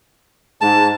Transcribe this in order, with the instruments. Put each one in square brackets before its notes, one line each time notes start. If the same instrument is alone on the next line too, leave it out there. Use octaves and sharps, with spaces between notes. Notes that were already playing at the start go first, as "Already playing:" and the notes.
[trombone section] G#2 [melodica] A5